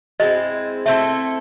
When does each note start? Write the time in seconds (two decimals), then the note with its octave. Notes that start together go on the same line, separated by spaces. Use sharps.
0.20 G#3 C4 E4 D#5
0.86 A3 C4 E4 A4 E5